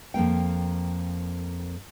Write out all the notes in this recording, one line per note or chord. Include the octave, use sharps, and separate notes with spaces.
F2 G#2 A#3 G5